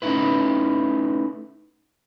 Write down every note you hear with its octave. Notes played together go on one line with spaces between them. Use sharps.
A3 C#4 D#4 E4 B4